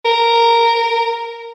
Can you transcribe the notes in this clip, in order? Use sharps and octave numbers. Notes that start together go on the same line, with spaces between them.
A#4